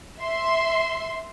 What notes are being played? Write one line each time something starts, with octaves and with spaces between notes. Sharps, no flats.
E5 C6